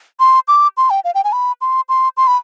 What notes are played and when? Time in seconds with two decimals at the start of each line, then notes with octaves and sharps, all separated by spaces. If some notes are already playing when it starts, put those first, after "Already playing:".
0.20 C6
0.48 D6
0.77 C6
0.90 G5
1.04 F5
1.15 G5
1.24 G#5
1.33 B5
1.61 C6
1.89 C6
2.17 C6
2.27 B5